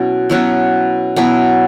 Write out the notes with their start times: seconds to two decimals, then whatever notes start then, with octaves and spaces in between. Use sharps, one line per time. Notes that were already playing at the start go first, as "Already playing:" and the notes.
Already playing: B2 F#3 C#4 E4
0.30 B2 F#3 C#4 E4
1.16 B2 F#3 C#4 E4